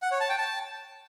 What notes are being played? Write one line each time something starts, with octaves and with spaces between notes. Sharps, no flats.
F#5
C#5
A5
G5
A5